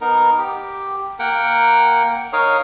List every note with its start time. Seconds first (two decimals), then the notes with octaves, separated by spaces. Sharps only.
0.01 B3 D#4 A#4
0.38 G4
1.19 A#3 A#4 F#5 G5
2.33 D#4 A#4 C#5 F5 D#6